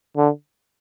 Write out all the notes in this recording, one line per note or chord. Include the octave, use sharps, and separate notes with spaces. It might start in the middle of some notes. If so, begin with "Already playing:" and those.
D3